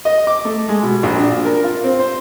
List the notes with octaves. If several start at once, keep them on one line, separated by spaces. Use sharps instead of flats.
D#5
D6
A3
G#3
B2
A#1
D4
A#4
F4
C4
C5